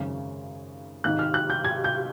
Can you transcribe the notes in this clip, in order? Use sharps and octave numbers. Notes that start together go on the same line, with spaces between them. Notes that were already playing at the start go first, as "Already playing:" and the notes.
Already playing: G#1 F#2 C#3
G#1 G#2 D#3 F#6
F6
F#6
G6
G#6
G6